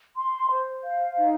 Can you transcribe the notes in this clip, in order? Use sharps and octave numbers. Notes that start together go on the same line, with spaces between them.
C6
C5
F5
D#4